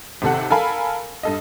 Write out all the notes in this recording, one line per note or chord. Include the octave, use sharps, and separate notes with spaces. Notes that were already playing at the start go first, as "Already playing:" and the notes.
G#1 C3 A4 F#5
A4 A#4 F5 G#5 B5
G2 A4 D#5